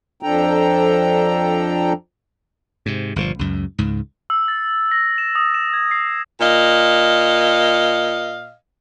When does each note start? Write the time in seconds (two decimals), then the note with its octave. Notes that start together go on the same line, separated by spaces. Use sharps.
0.23 F2 F3 D4 A4 G5 A#5
2.86 G#2 C3
3.16 G1 A#2 D3 F3
3.39 C#2 F#2
3.78 C#2 G#2
4.30 E6
4.48 A6
4.92 A#6
5.18 E7
5.35 D#6
5.54 E7
5.74 G#6
5.91 C7
6.40 A#2 D#5 F5